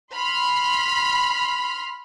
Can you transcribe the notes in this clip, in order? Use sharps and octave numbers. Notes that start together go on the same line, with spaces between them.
B5 C6 F6